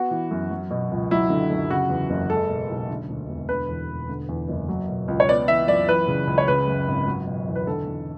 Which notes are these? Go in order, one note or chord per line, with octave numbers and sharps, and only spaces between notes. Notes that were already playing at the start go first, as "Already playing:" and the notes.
Already playing: B3 F#4
E3
F#2
F#3
B2
C#2
F#3 E4
D3
F#2
C#3 F#4
E2
F#1
G#3 A4
B2
B1
D3
D2
E1
D3 B4
E2
E1
D3
E2
F#1
F#3
B2
C#2
C#5
B3 D5
E3 E5
F#2 D5
E3 B4
C#3
C#2
C#5
C#3 B4
F#2
G#1
F#3
B2
E2
B4
D3 A4
E2